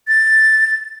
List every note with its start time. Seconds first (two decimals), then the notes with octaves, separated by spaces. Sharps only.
0.08 A6